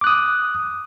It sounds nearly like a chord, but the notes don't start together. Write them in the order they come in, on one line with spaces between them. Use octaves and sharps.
D6 F#6 D#6